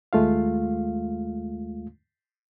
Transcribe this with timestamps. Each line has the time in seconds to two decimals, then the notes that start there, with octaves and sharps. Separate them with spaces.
0.13 D#2 G#3 A3 F4 F5